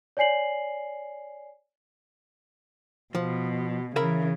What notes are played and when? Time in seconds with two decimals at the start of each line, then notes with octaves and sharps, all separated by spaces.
0.17 C#5 D5 G#5 C7 F#7
3.15 B2 F3
3.96 C#3 E3 A#4 E5 B5